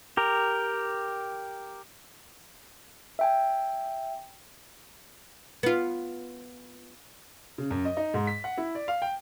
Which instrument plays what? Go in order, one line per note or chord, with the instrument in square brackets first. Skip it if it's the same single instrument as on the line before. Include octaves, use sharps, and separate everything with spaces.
[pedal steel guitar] G4 A#4
[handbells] E5 G5 G#5
[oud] B3 F4
[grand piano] C#3
F#2
D#5
D#4
G#2
B6
F#5
E4
D5
F5
G5